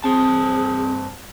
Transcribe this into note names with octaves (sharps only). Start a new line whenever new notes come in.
G2 C4 G#4 C5 A5